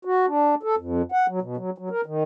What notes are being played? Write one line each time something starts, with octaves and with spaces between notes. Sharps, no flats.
F#4
D4
A4
F2
F#5
F#3
B2
F#3
F#3
A#4
D#3